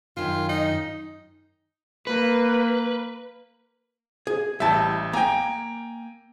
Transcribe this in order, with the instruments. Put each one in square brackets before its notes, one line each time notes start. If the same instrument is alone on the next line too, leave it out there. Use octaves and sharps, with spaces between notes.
[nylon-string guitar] F#2 D#3 [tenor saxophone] F4
[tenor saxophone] D#4
[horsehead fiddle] A#3 [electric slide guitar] B4
[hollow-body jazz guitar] G#4
[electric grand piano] A1 E5 [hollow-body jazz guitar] G3 A5
[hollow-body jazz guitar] A#3 [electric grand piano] G5 G#5 A#5